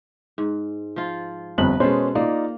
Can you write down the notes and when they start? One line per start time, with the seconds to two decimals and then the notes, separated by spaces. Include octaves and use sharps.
0.38 G#2
0.96 F3 F4
1.58 G1 F2 B4 F#7
1.80 B2 G#3 B3 C#4 A4 C5
2.15 A#3 D#4 F4 D5